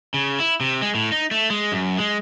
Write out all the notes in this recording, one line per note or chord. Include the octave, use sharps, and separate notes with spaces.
C#3
E4
C3
G#3
A2
D#4
A3
G#3
F#2
G#3